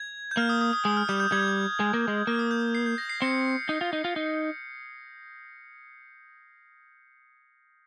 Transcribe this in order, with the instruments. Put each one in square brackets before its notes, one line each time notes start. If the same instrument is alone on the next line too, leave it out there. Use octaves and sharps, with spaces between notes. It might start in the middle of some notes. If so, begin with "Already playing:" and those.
Already playing: [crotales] G#6
G6
[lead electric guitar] A#3 [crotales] F6
[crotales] D#6
D#6
D#6
[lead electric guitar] G#3 [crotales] D#6
[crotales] F6
[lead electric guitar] G3 [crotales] G6
[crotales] G6
[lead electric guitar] G3 [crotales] G#6
[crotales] G6
G#6
[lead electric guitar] G#3
A#3
G#3
[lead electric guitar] A#3 [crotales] F6
[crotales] D#6
G6
C7
G6
A#6
C7
[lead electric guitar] C4 [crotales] C#7
[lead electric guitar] D#4
F4
D#4
F4
D#4